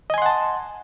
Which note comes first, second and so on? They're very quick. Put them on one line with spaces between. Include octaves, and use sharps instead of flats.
D#5 G#5 C6 F#5 A5